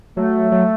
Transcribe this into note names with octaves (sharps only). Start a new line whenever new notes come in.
F#3 A3
F#3